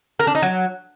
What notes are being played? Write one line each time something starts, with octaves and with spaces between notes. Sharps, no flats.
A#4
D4
D#4
F#3